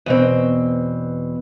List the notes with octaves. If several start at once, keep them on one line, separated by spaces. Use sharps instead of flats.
E2 B2 C4